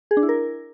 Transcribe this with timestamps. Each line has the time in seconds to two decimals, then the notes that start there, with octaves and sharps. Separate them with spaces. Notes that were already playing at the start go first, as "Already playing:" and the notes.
0.11 G#4
0.17 D4
0.23 E4
0.29 A#4